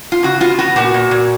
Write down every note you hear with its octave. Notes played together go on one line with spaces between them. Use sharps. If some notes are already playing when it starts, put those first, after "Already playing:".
F4
C#3 F#4
B3 F4
B3 F#4
A#2 F#4
A#2
A#2